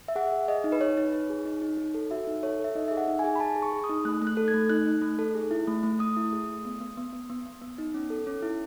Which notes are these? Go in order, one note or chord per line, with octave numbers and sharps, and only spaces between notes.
E5
G#4 F#5
G#4
G#4 D#5
D#4
B4
D#4 C#5
D#4
D#4
G#4
D#4
D#4
D#4
A4
F#4 E5
D#4
A4 C#5
A4 E5
D#4 D#5
G#4 E5
F#5
D#4
G#4 G#5
B5
D#4 A5
G#4
C#6
G#4
D#6
D#4
A3 F#6
A3
F#6
A4
G#6
A3
D#4 F#6
D#4
A3
A4
G#4
E4
A3
A3
A3 D#6
E4
G#4
A3
B3
B3
B3
B3
B3
B3
B3
D#4
C#4
A4
C#4
E4